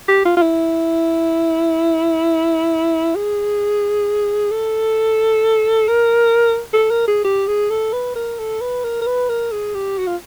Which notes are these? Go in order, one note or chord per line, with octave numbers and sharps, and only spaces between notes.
G4
F4
F4
E4
G#4
A4
A#4
A4
A#4
G#4
G4
G#4
A4
B4
A#4
A4
B4
A#4
A#4
B4
A#4
G#4
G4
F#4
F4